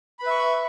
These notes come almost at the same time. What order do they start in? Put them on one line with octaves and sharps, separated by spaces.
B5 B4 E5 C#6